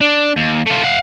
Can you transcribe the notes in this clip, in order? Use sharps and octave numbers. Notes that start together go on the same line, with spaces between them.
D4
D#2
A3 F4
F5 F#5